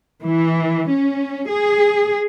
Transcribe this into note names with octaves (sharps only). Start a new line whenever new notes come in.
E3
C#4
G#4